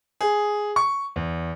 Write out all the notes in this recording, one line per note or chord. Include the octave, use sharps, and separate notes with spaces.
G#4
C#6
E2